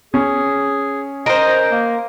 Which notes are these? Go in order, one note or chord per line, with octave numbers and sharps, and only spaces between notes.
C#4 G#4
A#4 C5 D#5
A#3